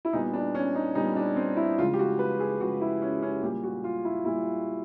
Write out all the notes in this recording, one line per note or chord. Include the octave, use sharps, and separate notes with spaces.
E4
A#2 G3 B3 D#4
D4
C#4
D#4
A#2 G3 B3 D#4
D4
C4
E4
C#3 F3 G#3 F4
G4
F#4
B4
G#4
C#3 F3 G#3 F#4
E4
C#4
C#4
A#2 G3 A#3 G4
F#4
F4
E4
A#2 G3 A#3 E4